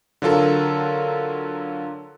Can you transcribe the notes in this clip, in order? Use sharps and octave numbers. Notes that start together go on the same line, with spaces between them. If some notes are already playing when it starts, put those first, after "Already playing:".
D3 F#3 F4 A4 A#4